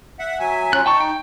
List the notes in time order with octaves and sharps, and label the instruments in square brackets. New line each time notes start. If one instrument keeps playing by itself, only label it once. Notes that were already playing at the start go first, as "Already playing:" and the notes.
[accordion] E5 F#5
F#3 E5 G#5
[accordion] F#3 C#4 F4 [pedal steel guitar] F#6
[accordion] D#4 [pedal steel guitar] G5 A5 C#6
[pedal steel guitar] G5